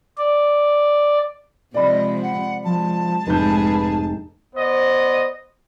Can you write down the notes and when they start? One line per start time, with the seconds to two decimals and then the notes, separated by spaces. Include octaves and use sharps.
0.18 D5
1.74 C3 F3 G#3 D5 D#5 B5
2.22 F#5
2.64 F3 G#3 A5
3.27 F1 G#2 G#3 G#4 B4 G6
4.55 B3 C5 D5 D#5